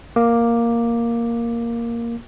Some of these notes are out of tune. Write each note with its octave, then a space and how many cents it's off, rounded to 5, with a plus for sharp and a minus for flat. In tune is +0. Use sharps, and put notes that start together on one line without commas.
A#3 +0 D6 +0